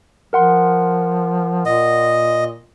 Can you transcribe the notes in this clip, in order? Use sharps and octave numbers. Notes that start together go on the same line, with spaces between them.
F3 A#4 F#5 C6
A#2 D#5